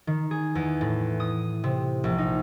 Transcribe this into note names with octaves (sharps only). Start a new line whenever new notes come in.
D#3
G#4
E2
A2
D#6
C3
A#1
D#4